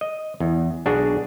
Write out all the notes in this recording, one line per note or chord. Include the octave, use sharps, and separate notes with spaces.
D#5
E2
B1 D4 F#4 G#4